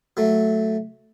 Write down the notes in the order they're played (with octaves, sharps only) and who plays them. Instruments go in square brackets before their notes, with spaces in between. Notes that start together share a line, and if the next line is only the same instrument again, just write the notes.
[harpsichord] F#3 A3